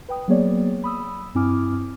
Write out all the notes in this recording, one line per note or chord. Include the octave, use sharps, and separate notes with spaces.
B4 G5 D#6
F#3 A#3 B3 G#4 C#5 D5
B5 D#6 E6
G2 C4 E4 G#5 D6 F6